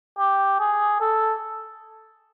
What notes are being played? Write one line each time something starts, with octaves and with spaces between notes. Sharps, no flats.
G4
G#4
A4